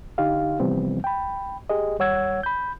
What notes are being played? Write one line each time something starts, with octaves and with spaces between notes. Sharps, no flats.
D3 D#4 G4 F5
C3 E3 F3 G3 B3 C4
G5 B5
G4 G#4 D#5
D#2 G3 C#5 F#5 E6 G#6
B5 G6